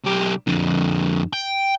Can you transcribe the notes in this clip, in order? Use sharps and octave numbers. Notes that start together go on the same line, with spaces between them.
B1 G4
F2 D3
G5